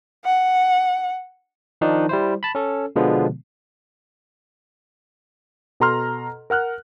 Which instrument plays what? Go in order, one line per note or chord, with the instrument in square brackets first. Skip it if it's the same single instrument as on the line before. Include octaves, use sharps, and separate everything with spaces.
[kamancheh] F#5
[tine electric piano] D#3 F3 D4 D#4
G3 E4 C5
A5 B5
C#4 A4
B2 D3 F3 G#3 B3
[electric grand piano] B2 A4 A#5 C6 F6
A#4 F#5 F6 F#6